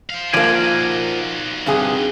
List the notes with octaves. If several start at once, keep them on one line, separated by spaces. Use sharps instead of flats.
C5 F5
F3 A#3 D#4 F#4 D5 G#5
G2 C3 G#4